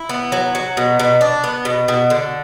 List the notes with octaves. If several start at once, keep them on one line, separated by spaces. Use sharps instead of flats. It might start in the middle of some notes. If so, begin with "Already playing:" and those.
Already playing: E4
B3
F#3
F#3
B2
B2
D4
B3
B2
B2
D3